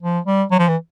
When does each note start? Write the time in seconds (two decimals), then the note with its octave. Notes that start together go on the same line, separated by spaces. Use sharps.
0.03 F3
0.26 G3
0.51 F#3
0.59 F3
0.68 E3